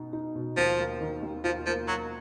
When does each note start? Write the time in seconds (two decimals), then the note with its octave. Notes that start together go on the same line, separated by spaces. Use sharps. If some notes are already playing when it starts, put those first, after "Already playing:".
Already playing: B2 D#4 F#4
0.13 D#4
0.35 B2
0.57 D#2 F3
0.78 A#3
1.01 D#3
1.22 D#2
1.44 F3 F4
1.66 F3 A#3
1.87 F#3 A#3